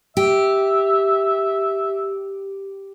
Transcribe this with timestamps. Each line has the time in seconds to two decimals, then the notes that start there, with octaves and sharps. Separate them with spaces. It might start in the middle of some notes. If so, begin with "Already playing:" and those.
0.17 G4 E5